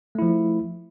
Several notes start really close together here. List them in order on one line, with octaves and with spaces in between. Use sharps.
A3 E4 F3